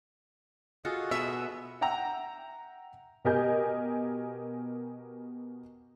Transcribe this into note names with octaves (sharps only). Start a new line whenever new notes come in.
F4 F#4 G#4 A4 D#5
B2 B3 E5
E5 F#5 G5 A#5 E6
B2 G4 A#4 D#5 G#5 G6